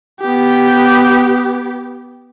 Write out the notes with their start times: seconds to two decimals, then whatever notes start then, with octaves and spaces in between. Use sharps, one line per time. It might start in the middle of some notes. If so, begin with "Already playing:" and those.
0.21 B3 G4